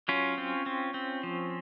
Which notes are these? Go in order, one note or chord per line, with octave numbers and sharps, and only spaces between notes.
F#3 C#4 F4
C4
C4
C4
F3